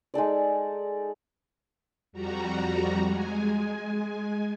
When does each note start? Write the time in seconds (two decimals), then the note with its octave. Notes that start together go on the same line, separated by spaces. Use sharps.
0.14 G#3 D#4 A4 D5
2.12 F2 G3 F#4 A#5
3.07 G#3 G#5